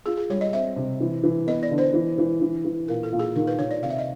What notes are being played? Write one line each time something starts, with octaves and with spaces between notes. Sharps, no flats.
F4 G#4
G#4
G3 C#5
D#5
C4 E5
C3
E3
E3
B3 D#5
D5
D3
C5
E3
E3
E3
E3
A#2 A#4
A4
A#2
G#4
D#3 A#4
B4
D#3 C#5
D5
C3 F5
E5
D#5